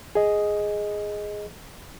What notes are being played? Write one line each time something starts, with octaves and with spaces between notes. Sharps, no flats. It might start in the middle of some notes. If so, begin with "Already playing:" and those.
G#4 D#5